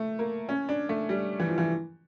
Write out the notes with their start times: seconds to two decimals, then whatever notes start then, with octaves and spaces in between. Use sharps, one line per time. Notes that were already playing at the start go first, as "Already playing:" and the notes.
Already playing: A3
0.19 A#3
0.49 C#4
0.69 D4
0.89 A3
1.09 G3
1.40 E3
1.49 F3
1.58 E3